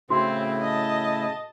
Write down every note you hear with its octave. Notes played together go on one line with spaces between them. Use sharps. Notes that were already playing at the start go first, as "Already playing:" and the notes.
A2 C#3 C4 E4 F#4
D#5 A5